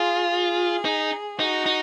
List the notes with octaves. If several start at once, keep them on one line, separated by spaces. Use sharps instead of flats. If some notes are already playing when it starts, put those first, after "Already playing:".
Already playing: F4 G#4
G#4
D#4
D#4 F#4
D#4